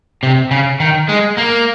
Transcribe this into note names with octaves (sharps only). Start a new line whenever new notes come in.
C3
C#3
D#3
G#3
A#3